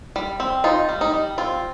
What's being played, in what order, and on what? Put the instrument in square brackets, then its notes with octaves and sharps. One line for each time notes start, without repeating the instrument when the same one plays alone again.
[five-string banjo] G3
C4
D#4 F4
G3
D#4
G3
C4 F4